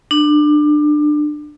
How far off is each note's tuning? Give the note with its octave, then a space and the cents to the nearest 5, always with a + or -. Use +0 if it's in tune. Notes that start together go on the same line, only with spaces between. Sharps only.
D4 +25